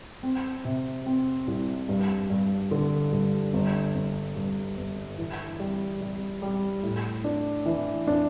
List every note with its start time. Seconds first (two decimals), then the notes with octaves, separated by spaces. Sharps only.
0.23 C4
0.65 C3
1.06 C4
1.47 C2
1.89 G2
2.30 G2
2.71 D3
3.12 G2
3.53 G1
3.94 G1
4.36 G2
4.77 G1
5.18 E3
5.59 G3
6.01 G3
6.42 G3
6.83 A2
7.24 D4
7.66 E3
8.07 D4